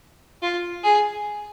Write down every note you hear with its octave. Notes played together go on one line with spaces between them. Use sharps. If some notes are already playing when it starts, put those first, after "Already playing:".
F4
G#4